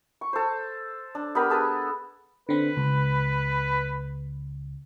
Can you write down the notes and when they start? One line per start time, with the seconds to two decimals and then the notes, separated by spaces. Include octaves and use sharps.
0.21 C#6
0.33 A4 C5
1.15 D4
1.35 B3 G4 A#4 B5
1.50 G#4 A4 B4
2.49 D3 C4 B4
2.77 C#2